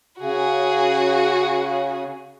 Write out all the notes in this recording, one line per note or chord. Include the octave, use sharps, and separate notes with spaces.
C#3 F#4 G#4